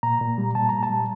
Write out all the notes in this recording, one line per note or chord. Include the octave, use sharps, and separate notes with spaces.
A#2 A#5
A#2
G3
A#2 A5
A#2 A#5
A5
G3